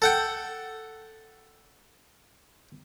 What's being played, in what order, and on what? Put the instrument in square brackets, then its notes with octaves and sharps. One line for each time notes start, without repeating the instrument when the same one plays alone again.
[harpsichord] A4 F#5 G5